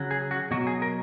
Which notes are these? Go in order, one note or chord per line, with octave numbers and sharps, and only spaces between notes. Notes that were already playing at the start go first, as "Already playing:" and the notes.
Already playing: C#3 F#3
G#4
F#4
B2 F#3 F#4
G#4
A#4